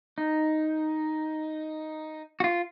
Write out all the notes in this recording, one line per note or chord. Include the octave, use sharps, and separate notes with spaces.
D#4
F#4
F4